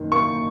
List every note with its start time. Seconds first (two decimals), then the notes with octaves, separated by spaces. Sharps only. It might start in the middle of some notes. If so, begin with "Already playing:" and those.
Already playing: F#1 D#3
0.12 A#3 C#6